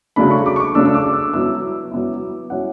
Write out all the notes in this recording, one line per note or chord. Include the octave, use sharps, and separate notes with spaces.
C#3 F#3 A3 D4 B5
C#6
D6
C#6
D6
C#3 F#3 A3 D4 E6
E6
D6
E6
F#3 B3 E4 E6
F#3 B3 E4
F#3 C#4 E4 F#5